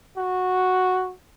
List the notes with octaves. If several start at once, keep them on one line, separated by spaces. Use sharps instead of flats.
F#4